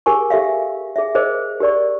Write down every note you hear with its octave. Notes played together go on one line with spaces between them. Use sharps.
G4 G#4 A#4 G#5 C#6
G4 A4 E5 F5
G#4 E5
G#4 A#4 C5 D#5
G4 A#4 D5 C#6